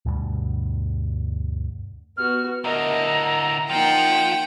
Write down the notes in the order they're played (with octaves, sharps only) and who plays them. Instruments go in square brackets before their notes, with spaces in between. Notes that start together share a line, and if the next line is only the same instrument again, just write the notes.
[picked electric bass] D2 G2 B2 G3
[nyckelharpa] B3 F#4 [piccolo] F6
[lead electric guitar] D3 E4 [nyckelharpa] A#4 D#5 [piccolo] A#5
[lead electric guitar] F3 [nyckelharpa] A#3 D#4 [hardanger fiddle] F#5 G5